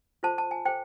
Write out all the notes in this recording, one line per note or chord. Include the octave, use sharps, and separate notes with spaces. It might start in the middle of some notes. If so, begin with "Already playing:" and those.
F4 A4 C5 A5
A5
G#5
A4 C5 G5